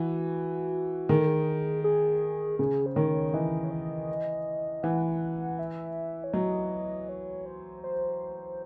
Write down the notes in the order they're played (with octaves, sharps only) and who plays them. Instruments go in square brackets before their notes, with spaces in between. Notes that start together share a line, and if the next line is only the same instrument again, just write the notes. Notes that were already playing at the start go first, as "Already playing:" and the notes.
Already playing: [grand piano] E3 [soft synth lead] F#4
[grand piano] D#3 [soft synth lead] G#4
[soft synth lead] A4
G#4
G#4
[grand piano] C#3 [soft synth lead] G#4
[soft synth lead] C5
[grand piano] D#3 [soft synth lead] C#5
[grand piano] E3 [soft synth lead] D#5
[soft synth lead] C#5
D#5
[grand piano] E3 [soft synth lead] F#5
[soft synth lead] E5
C#5
[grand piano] F#3 [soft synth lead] D#5
[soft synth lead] C#5
C5
C5